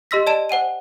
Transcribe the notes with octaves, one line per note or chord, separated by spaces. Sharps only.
G4 D#5 C6 E6 A#6 B6
D5 D#5 A5 D7 E7
C5 F#5 G#5 D#7